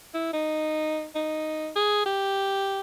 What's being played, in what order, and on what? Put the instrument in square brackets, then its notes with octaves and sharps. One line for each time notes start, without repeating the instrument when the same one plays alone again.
[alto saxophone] E4
D#4
D#4
G#4
G4